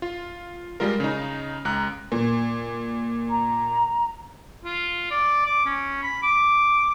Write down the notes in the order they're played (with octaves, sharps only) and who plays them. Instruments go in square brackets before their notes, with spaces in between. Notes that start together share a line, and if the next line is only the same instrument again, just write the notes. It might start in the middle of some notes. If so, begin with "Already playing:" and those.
[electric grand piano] F4
G3 G#3 F4 A#4
C#3 D#4
C#2 A#5 F#6
[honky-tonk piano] A#2
[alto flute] A#5
[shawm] F4
D5
D6
C#4
B5
D6